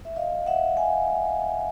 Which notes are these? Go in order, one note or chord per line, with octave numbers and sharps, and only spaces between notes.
E5
D#5 F5
E5 F#5
F#5 G#5